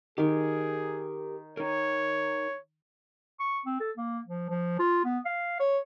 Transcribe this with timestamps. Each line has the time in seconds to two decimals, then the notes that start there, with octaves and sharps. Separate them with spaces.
0.18 D#3 G4 G#4 A#4
1.57 D#4 A#4 C#5
3.40 C#6
3.66 C4
3.80 A4
3.97 A#3
4.27 F3
4.50 F3
4.79 F4
5.05 B3
5.25 F5
5.60 C#5